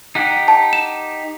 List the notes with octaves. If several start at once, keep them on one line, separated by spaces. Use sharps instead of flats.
D#4 G4 F#5
A5
E7